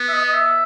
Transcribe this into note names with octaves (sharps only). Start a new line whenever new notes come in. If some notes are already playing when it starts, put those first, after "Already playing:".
Already playing: B3
E5
D#5
D#5
E5